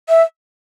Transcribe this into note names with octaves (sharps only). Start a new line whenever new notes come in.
E5